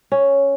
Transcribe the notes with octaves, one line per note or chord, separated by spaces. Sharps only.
C#4